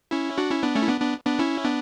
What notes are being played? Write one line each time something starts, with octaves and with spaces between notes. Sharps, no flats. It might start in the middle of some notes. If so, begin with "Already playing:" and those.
C#4 E4
D4 F#4
C#4 E4
B3 D4
A3 C#4
E4
B3 D4
B3 D4
B3 D4
C#4 E4
B3 D4